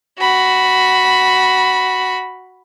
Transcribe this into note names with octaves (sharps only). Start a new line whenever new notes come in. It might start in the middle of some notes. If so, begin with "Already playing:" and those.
F#4 B5